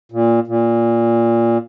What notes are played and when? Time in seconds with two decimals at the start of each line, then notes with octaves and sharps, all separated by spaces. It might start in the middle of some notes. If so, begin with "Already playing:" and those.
0.12 A#2
0.47 A#2